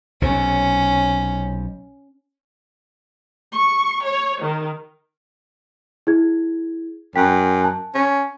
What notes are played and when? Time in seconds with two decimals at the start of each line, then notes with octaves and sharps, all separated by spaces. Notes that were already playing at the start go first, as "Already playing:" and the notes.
0.22 B1 C3 C#4
3.53 C#6
4.05 C#5
4.41 D#3
6.07 E4 G#4 G#6
7.16 F#2 G5 B6
7.64 A5
7.95 C#4